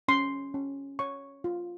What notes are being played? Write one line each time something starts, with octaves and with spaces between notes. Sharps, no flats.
C#4 C6
C#4
C#5 C#6
F4